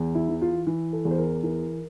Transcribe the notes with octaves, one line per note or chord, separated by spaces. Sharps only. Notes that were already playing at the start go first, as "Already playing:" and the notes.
Already playing: E2
E4
E3
F4
E3
A4
E2
C5
A#4
E3 A#4